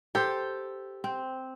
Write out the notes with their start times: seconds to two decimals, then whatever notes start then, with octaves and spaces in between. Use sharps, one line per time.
0.15 G4 A4 C5
1.04 C4